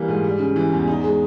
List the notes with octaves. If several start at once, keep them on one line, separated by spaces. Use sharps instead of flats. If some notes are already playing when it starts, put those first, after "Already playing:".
Already playing: E3 G3 A#3
G#2
G3
C#3
E3
E2
D#4
G#3